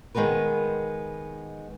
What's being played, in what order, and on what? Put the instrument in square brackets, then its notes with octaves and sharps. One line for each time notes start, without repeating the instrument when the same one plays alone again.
[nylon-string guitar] D#3 G#3 B3 A#4 B4